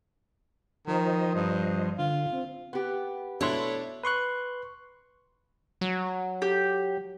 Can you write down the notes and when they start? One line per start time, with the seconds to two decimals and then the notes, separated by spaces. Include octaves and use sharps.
0.87 D#3 F3 C5 D#5
1.35 G2
1.99 D3 F4
2.32 C4
2.73 B3 G4
3.41 B2 A3 D4 E4 C#5 C6
4.04 B4 C6 C#6 F#6
5.81 F#3
6.42 G4